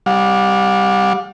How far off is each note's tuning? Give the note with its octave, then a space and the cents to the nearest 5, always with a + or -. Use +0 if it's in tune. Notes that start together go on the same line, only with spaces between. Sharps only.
G3 +0 F#5 -45